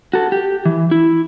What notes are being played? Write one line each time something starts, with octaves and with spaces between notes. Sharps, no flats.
F#4 A4
G4
E3
E4